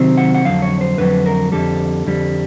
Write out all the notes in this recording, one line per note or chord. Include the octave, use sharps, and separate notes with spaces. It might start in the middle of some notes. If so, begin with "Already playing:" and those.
Already playing: C3 D#3 F#3 C4
F#5
F#5
F2 D3 F#3 F5
C#5
C5
F2 D3 F#3 B4
A#4
F2 D3 G3 A4
F2 D3 G3